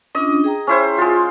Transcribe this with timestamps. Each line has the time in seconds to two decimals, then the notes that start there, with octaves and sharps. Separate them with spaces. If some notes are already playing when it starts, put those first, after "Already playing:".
0.15 C#4 D4 F4 D#5
0.44 G#4 G5 A#5
0.67 C#4 E4 C5
0.98 G#3 F4